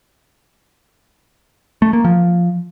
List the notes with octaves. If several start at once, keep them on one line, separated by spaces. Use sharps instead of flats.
A3
A#3
F3